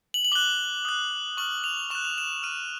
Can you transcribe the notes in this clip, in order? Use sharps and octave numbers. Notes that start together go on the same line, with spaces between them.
F#7
F#7
D6 F#6 G7
D#6 F#6
C#6 F6 F#7
F7
C#6 F#6 E7
F7
E7
D6 F6 D#7